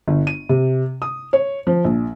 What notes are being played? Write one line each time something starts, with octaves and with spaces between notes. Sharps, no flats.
G1
D#7
C3
D#6
C#5
F3
A#1